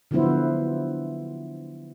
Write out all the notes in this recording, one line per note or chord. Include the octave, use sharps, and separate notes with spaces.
D3 F3 F#3 B3 E4 C5